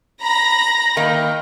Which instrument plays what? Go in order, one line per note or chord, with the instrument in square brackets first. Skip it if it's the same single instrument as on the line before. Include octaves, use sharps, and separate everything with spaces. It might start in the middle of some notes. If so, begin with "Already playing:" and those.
[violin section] A#5 B5 A#6
[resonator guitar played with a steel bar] D#3 A#3 D#4 [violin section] G5